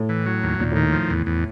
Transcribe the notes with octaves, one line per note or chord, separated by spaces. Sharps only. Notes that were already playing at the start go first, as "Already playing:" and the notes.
Already playing: A2
E3
F#3
D#2
D#2 A#2
A2
D#3
A2
F3
E2
E2